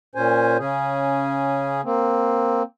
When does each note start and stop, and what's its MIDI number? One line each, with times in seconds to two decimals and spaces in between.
0.15 0.57 46
0.15 0.57 61
0.15 0.57 72
0.15 0.57 80
0.58 1.81 49
0.58 1.81 61
0.58 1.81 68
1.84 2.63 58
1.84 2.63 60